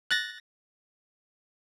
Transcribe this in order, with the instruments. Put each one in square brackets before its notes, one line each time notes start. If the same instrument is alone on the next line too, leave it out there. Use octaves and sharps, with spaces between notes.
[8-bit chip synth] F#6 A6 A#6